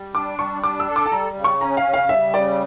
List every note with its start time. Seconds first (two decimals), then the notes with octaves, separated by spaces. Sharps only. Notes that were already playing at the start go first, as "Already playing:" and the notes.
Already playing: G3
0.14 D4 D6
0.39 G3 C#6
0.63 D4 D6
0.80 E6
0.88 A4
0.96 D6
1.06 A5
1.12 G3 A#5
1.36 C#3
1.44 C#6
1.61 C#4 A#5
1.77 F5
1.85 C#3
1.93 F5
2.09 G3 E5
2.34 C#3 D5